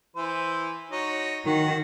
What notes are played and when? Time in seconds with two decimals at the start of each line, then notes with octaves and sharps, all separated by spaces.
0.16 E3 C5
0.91 D#4 F#4 C#5
1.46 D#3 F#4